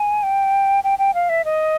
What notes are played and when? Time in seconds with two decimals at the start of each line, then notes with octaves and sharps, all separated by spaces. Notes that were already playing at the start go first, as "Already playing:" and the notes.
Already playing: G#5
0.23 G5
0.84 G5
0.99 G5
1.14 F5
1.29 E5
1.45 D#5